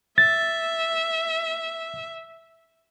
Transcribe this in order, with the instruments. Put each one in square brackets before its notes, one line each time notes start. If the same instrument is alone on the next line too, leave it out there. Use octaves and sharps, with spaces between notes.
[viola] E5 [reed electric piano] A6